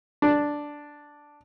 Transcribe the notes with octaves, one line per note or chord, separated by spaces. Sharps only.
D4